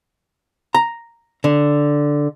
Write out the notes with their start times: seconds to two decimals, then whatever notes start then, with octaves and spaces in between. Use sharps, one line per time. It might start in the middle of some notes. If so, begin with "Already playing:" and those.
0.75 A#5
1.44 D3